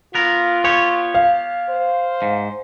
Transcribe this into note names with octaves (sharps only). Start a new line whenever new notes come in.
B3 F4 A#4
B3 G4 C#5 C#6
F5
C5
G#2